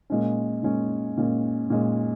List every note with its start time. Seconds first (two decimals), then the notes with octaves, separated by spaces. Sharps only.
0.10 A#2 G#3 C#4
0.63 A#2 G#3 C#4
1.17 A#2 G#3 C#4
1.70 A#2 G#3 C#4